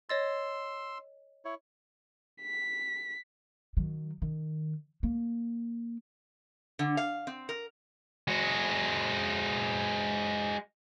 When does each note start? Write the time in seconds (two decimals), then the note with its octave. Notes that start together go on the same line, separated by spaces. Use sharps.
0.09 C#5 D#5 C6 E6 A6
1.45 E4 C#5
2.42 B6
3.77 D#3 F#3
4.22 D#3
5.03 A#3
6.79 D3
6.97 F5
7.27 C4
7.49 A#4
8.28 G#3 F#4